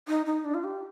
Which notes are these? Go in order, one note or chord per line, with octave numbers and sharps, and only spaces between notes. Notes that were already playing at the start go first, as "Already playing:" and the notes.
D#4
D#4
D4
F4
G4